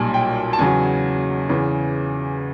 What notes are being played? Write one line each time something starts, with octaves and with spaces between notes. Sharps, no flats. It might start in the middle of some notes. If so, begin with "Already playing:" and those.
Already playing: B1 A#2 G3 G#5
G5
A5
E2 C#3 F#3 G#5
E2 C#3 E3